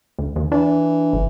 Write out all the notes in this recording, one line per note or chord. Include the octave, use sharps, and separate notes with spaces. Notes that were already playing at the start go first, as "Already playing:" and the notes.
D2
D#2
E3 D4
G1